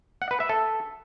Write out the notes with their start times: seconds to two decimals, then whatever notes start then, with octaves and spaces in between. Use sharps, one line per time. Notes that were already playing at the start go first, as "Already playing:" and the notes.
0.22 F#5
0.31 B4
0.40 E5
0.49 A4